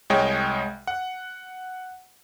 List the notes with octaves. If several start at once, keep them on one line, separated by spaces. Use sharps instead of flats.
C2 G#3 C#5 D#5 G5
F#5